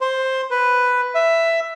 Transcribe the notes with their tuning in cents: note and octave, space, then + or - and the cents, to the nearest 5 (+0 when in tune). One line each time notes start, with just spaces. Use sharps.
C5 +10
B4 +5
E5 +10